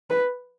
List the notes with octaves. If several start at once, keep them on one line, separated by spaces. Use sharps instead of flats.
B4